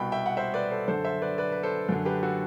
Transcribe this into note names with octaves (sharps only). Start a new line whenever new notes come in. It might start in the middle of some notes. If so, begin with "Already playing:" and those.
Already playing: C2 B2 G5 B5
E5 G5
F#5
C5 E5
B4 D5
A4 C5
F#2 D3 A4 C5
C5 E5
B4 D5
B4 D5
B4
A4 C5
F#2 D3
G4 B4
F#4 A4